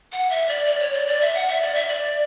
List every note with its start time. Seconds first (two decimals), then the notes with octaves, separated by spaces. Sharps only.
0.12 F#5
0.30 E5
0.49 D5
0.66 D5
0.80 C#5
0.94 D5
1.07 D5
1.21 E5
1.35 F#5
1.48 E5
1.62 D5
1.75 E5
1.88 D5